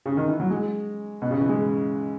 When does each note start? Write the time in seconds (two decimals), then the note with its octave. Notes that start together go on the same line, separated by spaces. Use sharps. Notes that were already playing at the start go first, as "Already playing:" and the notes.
0.06 C#3
0.17 D#3
0.28 E3
0.40 F#3
0.50 G#3
1.22 B2
1.31 C#3
1.40 E3
1.49 G#3